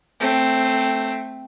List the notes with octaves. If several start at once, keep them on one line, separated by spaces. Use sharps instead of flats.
A3 C4